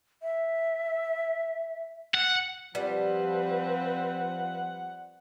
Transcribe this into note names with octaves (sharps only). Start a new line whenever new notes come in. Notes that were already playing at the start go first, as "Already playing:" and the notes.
E5
F#5
F3 G3 C4 B4 F#5